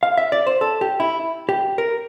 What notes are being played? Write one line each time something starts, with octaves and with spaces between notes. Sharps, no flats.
F5
E5
D5
C5
A4
G4
E4
G4
A#4